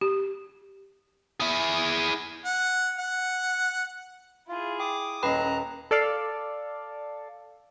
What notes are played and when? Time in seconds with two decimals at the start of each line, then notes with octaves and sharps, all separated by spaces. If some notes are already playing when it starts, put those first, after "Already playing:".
0.01 G4
1.40 E4 G#4
2.45 F#5
2.98 F#5
4.49 E4 F4 G#4
4.80 G5 D6 D#6
5.23 D#1 C#4 B4 D#5 G5 A#5 B5 F#6
5.91 A4 D5 F5